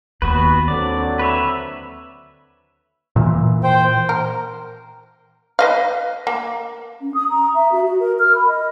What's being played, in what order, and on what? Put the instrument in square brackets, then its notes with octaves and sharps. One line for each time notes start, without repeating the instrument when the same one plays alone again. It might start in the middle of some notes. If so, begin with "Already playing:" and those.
[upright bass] D#2 [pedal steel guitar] B3 F#4 B4
[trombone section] D3 F#3 C4 [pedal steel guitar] D5
[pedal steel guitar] B4 C#5 E5
[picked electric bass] A#2 E3
[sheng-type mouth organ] C5 G5
[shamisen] A#4
B4 D#5 F5
A#3
[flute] C#4
D#6
A#5
E5
F#4
F#4
A#4
F6
B5
D#5